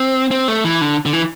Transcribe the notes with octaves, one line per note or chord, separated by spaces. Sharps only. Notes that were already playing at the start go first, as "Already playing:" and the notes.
Already playing: C4
C4
A3
E3
D3
D3
E3